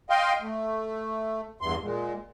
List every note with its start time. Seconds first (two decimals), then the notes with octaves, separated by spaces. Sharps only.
0.10 D#5 F5 G5 C6
0.42 A3
1.61 E2 G2 C6
1.83 A#2 G#3